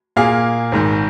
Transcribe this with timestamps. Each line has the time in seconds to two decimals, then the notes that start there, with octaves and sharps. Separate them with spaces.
0.16 A#2 A#3 G#4 F5
0.72 G#1 G#2 D#3